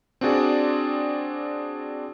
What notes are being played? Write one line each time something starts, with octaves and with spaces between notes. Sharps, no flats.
C4 D4 F#4 G#4 D5